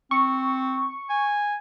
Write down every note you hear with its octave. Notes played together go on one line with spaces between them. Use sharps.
C4 C#6
G#5